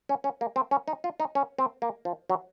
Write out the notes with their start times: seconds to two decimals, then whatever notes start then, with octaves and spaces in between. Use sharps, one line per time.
0.09 C#4
0.24 C#4
0.41 A#3
0.56 C4
0.71 C#4
0.88 D#4
1.04 F4
1.20 D#4
1.35 C#4
1.58 C4
1.82 A#3
2.05 F3
2.30 F#3